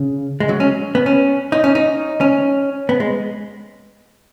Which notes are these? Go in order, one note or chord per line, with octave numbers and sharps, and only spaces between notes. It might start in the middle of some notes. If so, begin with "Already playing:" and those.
Already playing: C#3
G#3
F#3
C#4
B3
C#4
D#4
C#4
D#4
C#4
B3
G#3